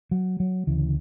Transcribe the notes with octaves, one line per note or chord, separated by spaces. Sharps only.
F#3
F#3
D2 C#3 E3